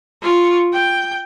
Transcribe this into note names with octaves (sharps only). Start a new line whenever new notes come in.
F4 C#6
G5